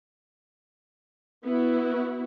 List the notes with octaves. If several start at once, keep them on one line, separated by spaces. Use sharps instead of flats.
B3 E4 F#4